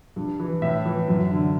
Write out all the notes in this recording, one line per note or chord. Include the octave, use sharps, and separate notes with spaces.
G2
E3
A2 E5
E3
F#2
D3